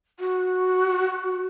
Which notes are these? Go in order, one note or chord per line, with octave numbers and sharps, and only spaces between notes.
F#4